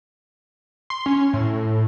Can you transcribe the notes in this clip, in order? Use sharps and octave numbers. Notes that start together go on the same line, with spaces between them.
C6
C#4
A2